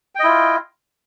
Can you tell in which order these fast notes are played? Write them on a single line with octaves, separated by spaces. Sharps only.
G5 D#5 E4 F4